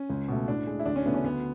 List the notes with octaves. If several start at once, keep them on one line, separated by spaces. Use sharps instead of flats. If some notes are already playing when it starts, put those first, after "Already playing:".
Already playing: C#4
C#2
B2 A3
A2 D4
G#3
E4
D2 D4
C#4
C#3 E3 A3 B3
C#4
D2 B3